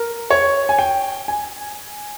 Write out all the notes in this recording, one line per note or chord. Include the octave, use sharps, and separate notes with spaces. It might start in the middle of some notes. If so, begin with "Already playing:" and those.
Already playing: A#4
C#5
G#5
G5
G#5